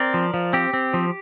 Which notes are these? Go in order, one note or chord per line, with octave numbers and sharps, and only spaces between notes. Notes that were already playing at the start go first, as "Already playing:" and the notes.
Already playing: C4 A#4 D5
F3
F3
C4 G4
C4
F3